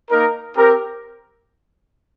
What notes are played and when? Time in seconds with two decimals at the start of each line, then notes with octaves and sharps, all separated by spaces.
0.11 A#3 D#4 A#4
0.57 C4 G4 A#4